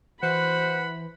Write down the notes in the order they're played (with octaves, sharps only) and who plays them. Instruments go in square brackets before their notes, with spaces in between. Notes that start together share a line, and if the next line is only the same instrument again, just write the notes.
[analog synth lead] E3 [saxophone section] F#4 B4 C5 [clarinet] F#5 [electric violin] B5